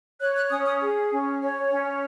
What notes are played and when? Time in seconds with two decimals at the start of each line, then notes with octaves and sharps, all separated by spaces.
0.20 C#5 F#6
0.36 F#6
0.50 C#4 D#6
0.65 D#6
0.80 G#4
1.11 C#4
1.41 C#5
1.70 C#4